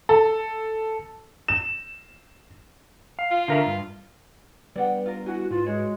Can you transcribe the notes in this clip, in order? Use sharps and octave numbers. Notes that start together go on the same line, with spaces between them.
A4
E7
F5
F4
D3 A#4 E5
G2
G3 B3 D4 B4 D5 F#5 G5
F4 A#4
E4 F#4 G#5
G#2 F4 B4 C5
G#3 F#4 C#5